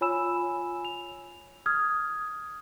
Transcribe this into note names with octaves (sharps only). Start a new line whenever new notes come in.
F4 C#5 G#5 B5 E6 E7
F7
D#6 F6 G#6